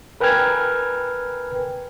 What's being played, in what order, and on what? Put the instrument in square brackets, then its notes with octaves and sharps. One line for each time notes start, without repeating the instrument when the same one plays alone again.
[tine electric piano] A#4 B4 G5 G#5 F6 G#6